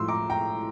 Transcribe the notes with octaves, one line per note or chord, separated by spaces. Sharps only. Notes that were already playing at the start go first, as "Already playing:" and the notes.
Already playing: A2 F3 C6 E6
A#5 D6
G5 A#5